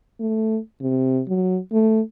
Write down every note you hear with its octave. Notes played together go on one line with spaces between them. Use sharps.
A3
C3
F#3
A3